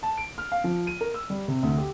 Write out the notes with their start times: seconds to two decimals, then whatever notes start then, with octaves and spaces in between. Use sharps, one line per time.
0.03 A5
0.17 D7
0.38 F6
0.52 F5
0.64 F3
0.87 D#7
1.01 A#4
1.14 E6
1.30 G3
1.48 C3
1.63 D2
1.78 G4